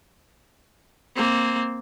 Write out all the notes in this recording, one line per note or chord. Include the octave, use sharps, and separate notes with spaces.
A#3 C4